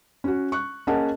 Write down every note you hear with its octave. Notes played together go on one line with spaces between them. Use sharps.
C#4 F#4
C#6 F#6
A#3 C#4 G#4 D#5 F#5 A5